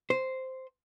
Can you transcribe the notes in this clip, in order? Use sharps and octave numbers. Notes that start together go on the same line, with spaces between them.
C5